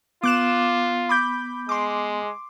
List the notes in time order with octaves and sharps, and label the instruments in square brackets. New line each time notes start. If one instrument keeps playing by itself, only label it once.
[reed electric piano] B3 [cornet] F4 [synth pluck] D6 F#6 E7
[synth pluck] B5 D6 G6
[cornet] G#3 [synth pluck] C6 D6